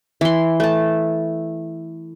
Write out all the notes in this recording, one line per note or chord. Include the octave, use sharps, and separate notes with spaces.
E3 C6
A3 A5